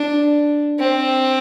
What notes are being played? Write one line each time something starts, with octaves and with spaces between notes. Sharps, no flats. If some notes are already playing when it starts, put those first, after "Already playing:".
Already playing: D4
C4